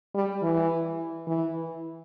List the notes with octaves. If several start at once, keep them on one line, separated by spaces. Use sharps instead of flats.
G3
E3
E3